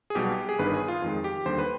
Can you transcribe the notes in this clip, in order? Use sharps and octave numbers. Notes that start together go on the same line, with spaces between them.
G#4
B1 B2 G3 B3 G4
G#4
G1 G2 D#3 B3 B4
G#4
F4
F2 D#3 G#3
G4
D#2 D3 G3 C5
B4